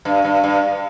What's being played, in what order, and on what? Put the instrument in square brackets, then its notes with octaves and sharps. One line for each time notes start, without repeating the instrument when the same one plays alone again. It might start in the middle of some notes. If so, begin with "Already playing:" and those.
[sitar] G2
G2
G2